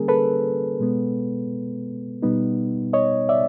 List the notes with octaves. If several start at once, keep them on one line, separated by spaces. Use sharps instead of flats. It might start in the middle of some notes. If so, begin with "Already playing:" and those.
Already playing: D3 G3 A#3 C#4 G#4 A#4
A4 B4
B2 G#3 B3
B2 G3 B3 D#4
C#5 D#5
D5 E5